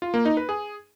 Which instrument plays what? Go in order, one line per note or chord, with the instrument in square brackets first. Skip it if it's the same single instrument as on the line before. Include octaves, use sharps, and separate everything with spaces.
[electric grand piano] F4
A#3
D#4
B4
G#4